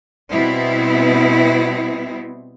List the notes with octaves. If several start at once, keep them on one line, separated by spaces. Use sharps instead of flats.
B2 G3 B3 C4 E4